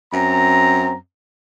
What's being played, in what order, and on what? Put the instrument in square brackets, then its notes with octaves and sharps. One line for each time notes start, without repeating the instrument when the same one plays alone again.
[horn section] F#2 C4 A#5